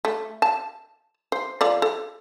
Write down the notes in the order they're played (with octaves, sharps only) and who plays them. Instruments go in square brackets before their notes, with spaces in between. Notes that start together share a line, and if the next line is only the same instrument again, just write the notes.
[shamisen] A3
A5
C5
F3 A4 D5
A4